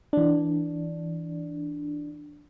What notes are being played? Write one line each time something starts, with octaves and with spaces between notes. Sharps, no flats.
E3 D4